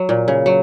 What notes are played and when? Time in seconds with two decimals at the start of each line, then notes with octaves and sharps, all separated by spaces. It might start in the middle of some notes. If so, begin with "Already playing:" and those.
Already playing: F#3
0.09 A#2
0.28 C#3
0.46 F#3